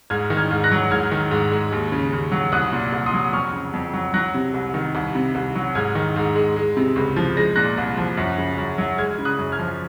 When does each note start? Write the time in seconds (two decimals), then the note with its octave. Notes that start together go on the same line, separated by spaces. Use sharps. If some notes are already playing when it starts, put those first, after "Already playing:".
0.10 G#2 F6 G#6
0.30 D#3
0.37 F6 G#6
0.51 G#2
0.64 F#6 A#6
0.71 F#3
0.91 G#2 F6 G#6
1.12 D#3
1.31 G#2
1.52 G#3
1.72 D#2
1.92 C#3
2.13 D#2
2.32 F#3
2.52 C2 D#6 F#6
2.73 A#2
2.93 C2
3.06 C6 D#6
3.14 F#3
3.24 D#6
3.33 F2 C#6 F6
3.53 C#3
3.73 F2
3.94 F#3
4.14 F#3 F#6 A#6
4.34 C3
4.54 C2
4.74 D#3
4.95 C2
5.15 C3
5.35 C2
5.55 F#3
5.75 G#2 F6 G#6
5.95 D#3
6.16 G#2
6.35 G#3
6.56 G#3
6.77 C3
6.96 C#2
7.16 F3
7.37 G#3 A#6
7.56 A#2 F#6 A#6
7.78 C2
7.97 F3
8.17 F#2
8.38 C#3
8.58 F#2
8.78 F#3
8.98 G#3 F6 G#6
9.18 C#3
9.25 D#6 F#6
9.39 F#2
9.52 F6 G#6
9.59 F3